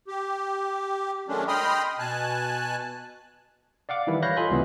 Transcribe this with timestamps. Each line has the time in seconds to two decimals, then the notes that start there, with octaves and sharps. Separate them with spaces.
0.08 G4
1.28 D#3 F#3 G#3 A3 C#4 D4
1.48 D#5 G5 B5 C6 D#6 F6
1.99 B2 G#5 A5 F#6
3.89 D5 F5 F#5 D6
4.07 D#3 E3 G3 E4
4.22 C#5 F5 B5 F#6 G6 A#6
4.37 F4 A4 D#5 G#5 B5 C6
4.50 C#2 C3 E3 G3 A3 B3